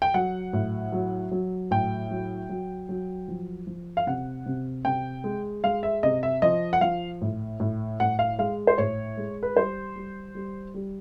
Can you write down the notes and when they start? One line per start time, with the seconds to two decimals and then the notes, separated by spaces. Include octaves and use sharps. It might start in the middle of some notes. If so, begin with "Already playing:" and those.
0.02 G5
0.14 F#3 F#5
0.53 A2
0.92 F#3
1.31 F#3
1.71 A2 G5
2.11 F#3
2.49 F#3
2.89 F#3
3.28 F3
3.67 F3
3.97 F5
4.07 C3 F#5
4.46 C3
4.85 C3 G5
5.24 G#3
5.64 G#3 F5
5.83 E5
6.03 C3 D#5
6.23 E5
6.42 F3 D#5
6.73 F#5
6.81 F3 F5
7.21 A2
7.60 A2
8.00 A2 F#5
8.19 F5
8.39 G#3 F5
8.67 C5
8.78 A2 C#5
9.17 G#3
9.43 B4
9.56 G3 C5
9.96 G3
10.35 G3
10.74 G3